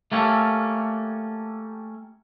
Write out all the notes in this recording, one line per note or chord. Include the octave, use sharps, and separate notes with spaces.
A3 A#3 C#4 G4 A4